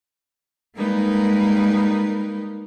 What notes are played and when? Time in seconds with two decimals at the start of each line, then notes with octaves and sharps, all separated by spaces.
0.76 G3 G#3 A#3 D#4 A#4 B4